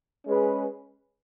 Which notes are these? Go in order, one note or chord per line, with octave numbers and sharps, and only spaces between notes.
G#3 C#4 G#4 B4